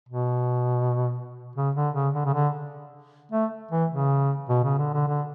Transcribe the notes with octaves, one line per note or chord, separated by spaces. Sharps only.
B2
C#3
D3
C#3
D3
C#3
D3
A3
E3
C#3
B2
C#3
D3
D3
D3